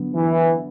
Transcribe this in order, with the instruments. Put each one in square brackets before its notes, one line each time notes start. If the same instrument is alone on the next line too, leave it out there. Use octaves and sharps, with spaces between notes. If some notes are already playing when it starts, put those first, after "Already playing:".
Already playing: [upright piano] D3 F#3 B3
[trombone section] E3